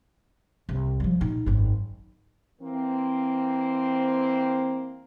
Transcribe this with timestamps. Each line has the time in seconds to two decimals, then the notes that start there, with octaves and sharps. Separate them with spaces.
0.69 C2
1.00 F3 G3
1.20 A#2 D#4
1.46 G#1 F#2
2.62 E3 A#3 C4